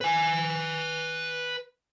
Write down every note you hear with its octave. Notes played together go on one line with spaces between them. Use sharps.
B4 G#5